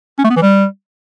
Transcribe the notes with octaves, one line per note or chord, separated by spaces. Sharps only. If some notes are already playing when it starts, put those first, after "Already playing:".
C#4
A3
B3
E3
G3